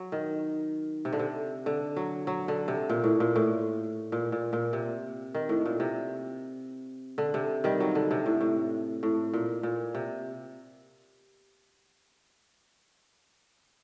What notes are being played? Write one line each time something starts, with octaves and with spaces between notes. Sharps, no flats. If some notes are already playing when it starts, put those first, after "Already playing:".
Already playing: F#3
D#3
C3
D3
C3
D3
F#3
F#3
D3
C3
A#2
A2
A#2
A2
A#2
A#2
A#2
C3
D#3
A2
A#2
C3
D3
C3
D#3 G3
F#3
D3
C3
A2
A2
A2
A#2
A#2
C3